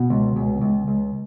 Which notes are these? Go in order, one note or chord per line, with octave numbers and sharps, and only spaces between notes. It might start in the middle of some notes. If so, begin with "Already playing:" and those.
Already playing: B2
C#2
C#2
C#2
C#2